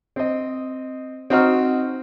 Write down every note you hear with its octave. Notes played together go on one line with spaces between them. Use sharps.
C4 D#5
C4 D#4 F#4 D#5 C#6 F6